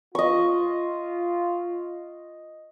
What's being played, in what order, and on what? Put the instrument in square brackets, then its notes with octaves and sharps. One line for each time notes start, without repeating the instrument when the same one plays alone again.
[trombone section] F4 [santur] D#5 C#6